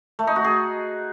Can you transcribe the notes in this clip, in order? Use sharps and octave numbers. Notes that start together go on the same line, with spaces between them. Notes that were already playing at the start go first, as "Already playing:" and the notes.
A3
D#4
F#4
G#4